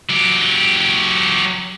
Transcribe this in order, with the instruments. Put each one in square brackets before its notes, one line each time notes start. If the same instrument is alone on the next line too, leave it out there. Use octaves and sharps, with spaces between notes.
[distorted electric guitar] F#3 G4